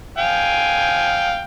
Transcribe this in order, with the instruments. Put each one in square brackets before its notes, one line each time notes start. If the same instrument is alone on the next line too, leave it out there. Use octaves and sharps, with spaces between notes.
[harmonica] F5 G5 G#5